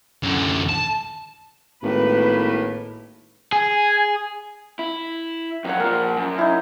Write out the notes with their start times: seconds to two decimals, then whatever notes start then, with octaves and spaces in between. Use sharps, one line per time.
0.23 F#2 D3
0.69 A5
1.83 G#1 A2 A#3 B4
3.52 G#4 G#5
4.79 E4
5.65 F2 F#3 F#5 G5
5.80 A#2 F3 A#4
6.17 F#2
6.38 D#4 E4